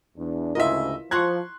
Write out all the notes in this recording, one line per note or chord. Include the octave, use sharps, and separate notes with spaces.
E2 D4
D2 G#2 C#3 E4 F4 A#4 D#5 E5
F3 A#5 C6 C#6 F#6 G#6